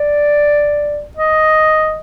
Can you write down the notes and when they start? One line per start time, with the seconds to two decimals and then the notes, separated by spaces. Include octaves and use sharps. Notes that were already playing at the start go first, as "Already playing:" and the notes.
Already playing: D5
1.17 D#5